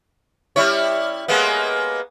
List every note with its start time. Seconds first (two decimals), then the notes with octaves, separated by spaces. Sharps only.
0.56 G3 E4 C#5
1.28 G#3 A#3 B3